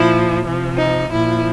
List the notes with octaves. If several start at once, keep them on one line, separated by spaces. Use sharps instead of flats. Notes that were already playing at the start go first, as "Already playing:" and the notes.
Already playing: A#2 F3 E4
C3 F3
D#4
A#2 F3 E4